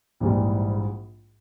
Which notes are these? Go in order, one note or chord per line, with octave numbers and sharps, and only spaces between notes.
A#1 G#2 E3 G3